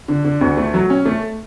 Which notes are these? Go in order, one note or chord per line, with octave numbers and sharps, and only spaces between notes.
D3
D3
D2
A3
F#3
C#4
A3